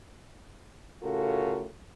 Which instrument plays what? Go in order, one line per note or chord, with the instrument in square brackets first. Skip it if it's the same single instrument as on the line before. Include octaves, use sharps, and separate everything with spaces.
[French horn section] A2 C#3 F4 F#4 A4 A#4